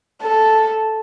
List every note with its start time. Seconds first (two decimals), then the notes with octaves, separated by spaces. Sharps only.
0.22 A4